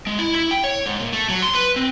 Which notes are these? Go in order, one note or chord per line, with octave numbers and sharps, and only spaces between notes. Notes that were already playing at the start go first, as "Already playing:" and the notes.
G#3
E4
E4
G5
C#5
G#2
A#2
A3
F#3
C6
B4
C4